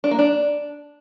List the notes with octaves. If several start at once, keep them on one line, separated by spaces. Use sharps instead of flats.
D4
A#3
D4